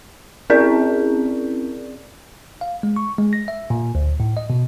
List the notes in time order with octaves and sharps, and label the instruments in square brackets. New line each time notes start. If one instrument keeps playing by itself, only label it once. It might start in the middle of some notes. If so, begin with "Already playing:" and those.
[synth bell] C4 C#4 E4 G#4 A#4 D5
[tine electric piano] F5
G#3
C#6
G#3
A#6
E5
A#2
D2
A2
D#5
B2